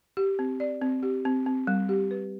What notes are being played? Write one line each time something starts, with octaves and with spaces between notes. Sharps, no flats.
G4
C4
D5
C4
G4
C4
C4
G3
G4
B4